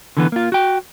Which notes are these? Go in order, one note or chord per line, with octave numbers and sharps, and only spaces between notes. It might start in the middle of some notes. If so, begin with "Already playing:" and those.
D3 E3 B3
A#3 F4
F#4 G5